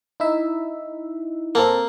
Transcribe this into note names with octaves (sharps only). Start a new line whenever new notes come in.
D#4 E4 E5
A#3 C4 A4 A#4